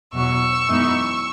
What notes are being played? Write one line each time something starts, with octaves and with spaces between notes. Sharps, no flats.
E2 B2 F#3 C#6 E6
F#2 E3 G#3 B3 D#4